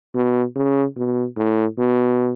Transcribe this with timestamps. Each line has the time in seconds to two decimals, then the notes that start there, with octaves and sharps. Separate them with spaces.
0.15 B2
0.56 C#3
0.97 B2
1.37 A2
1.78 B2